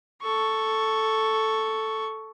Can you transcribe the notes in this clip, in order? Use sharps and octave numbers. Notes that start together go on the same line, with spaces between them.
A4 C#6